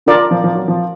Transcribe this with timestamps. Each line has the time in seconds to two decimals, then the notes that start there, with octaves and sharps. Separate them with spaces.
0.06 D3 F4 A#4 D5
0.31 F3
0.44 F3
0.55 F#3
0.68 F3